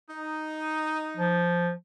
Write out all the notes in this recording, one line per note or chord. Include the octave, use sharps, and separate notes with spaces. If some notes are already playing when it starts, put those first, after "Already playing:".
D#4
F3